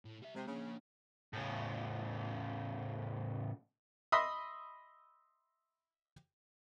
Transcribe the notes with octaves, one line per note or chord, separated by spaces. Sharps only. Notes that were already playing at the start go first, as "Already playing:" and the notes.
A2
G3 E5
C3 G#3
C#3 A#3 D4
A2 C#3
D#5 E5 B5 C6 D#6